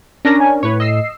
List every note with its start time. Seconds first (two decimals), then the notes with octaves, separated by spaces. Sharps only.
0.25 C#4 D4 A#4 A#6
0.40 G#5
0.63 A2 B4 C#5
0.80 D#5 E6 C7